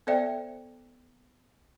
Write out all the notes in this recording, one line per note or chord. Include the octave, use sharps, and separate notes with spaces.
B3 A4 C5 D5 E5 G5